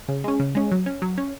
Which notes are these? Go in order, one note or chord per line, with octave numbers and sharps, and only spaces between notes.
C#3
G#3 C#4
C#3
G#3 C#4
F#3
C#4
F#3
C#4